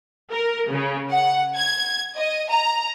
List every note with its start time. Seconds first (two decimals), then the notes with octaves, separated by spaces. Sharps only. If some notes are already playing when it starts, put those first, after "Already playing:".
0.31 A#4
0.72 C#3
1.12 F#5
1.56 G#6
2.17 D#5
2.51 A#5